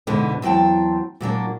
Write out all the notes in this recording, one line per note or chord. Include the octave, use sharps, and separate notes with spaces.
F2 G#2 B2 D3 B3
E2 F#3 C4 G5 A5
A#2 F#3 A#3 D4